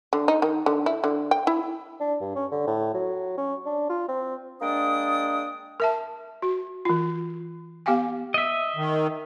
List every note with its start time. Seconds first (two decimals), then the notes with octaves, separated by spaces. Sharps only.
0.13 D3
0.28 D#4
0.42 D#3
0.66 D3
0.86 E4
1.04 D3
1.31 G5
1.47 E4
2.01 D4
2.20 G2
2.35 C#4
2.52 D3
2.67 A2
2.94 F#3
3.38 C#4
3.66 D4
3.90 F4
4.09 C4
4.61 G#3 A#3 D4 D5 G5 D#6
5.80 A#4 E5 A5
6.42 F#4
6.85 E3 F4
7.86 B3 G4 F5 G5 G#5
8.34 D#5 E5
8.76 D#3